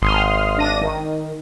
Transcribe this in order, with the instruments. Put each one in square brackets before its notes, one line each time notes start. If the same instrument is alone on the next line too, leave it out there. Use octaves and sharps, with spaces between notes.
[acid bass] G#1 [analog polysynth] C6 D#6 F6
[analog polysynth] D4 A#6 D#7
D#3